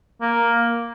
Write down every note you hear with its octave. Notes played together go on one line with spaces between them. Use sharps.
A#3